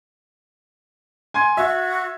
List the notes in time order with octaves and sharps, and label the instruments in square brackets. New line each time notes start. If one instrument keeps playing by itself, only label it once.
[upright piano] G#5 C6 G#6
[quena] F#4 [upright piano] E5